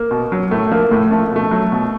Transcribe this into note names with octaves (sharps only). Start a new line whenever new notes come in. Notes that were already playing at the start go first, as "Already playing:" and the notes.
Already playing: A#3
B2
F#3
A2 A3
F3 A#3
A2 A3
F3 A3
B2 A3
F#3
B2